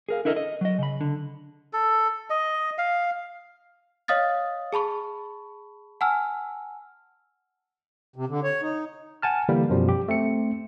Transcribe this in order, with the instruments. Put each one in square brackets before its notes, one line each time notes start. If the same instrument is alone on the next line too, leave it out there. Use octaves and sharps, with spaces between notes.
[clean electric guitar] G#4 A#4 F5
D4 E4 A4 A#4 D#5
D#5
F#3 D#5
C#3 B5
D3
[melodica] A4
D#5
F5
[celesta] C#5 D#5 F5 D#6 F6 A6
G#4 A5 B5 C#6
F#5 G#5 A5 E6 F6
[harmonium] C3
D3
C#5
D#4
[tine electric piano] F#5 G#5 A5 F6
D3 E3 G3 A#3
F#2 B2 F3 G3
G4
A3 C4 C#7